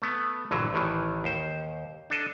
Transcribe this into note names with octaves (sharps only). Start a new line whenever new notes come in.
A3 B3
A#1 G2 D3 E3 F#3
A1 A2 D#3 E3
D#2 C5
D4 A4 D#5